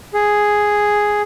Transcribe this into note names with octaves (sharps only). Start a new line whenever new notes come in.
G#4